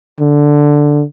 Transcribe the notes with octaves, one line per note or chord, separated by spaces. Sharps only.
D3